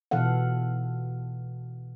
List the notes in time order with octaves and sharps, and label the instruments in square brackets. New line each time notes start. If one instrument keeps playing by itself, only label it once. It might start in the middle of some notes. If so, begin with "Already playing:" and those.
[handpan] B2 E3 A4 F5 F#5